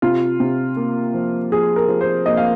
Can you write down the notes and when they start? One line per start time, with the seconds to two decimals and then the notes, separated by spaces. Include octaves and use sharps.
0.02 C3 F4
0.40 C3
0.76 A#3
1.14 F3
1.51 F3 G#4
1.76 A#4
1.88 F3
2.01 C5
2.26 A#3 D#5
2.37 F5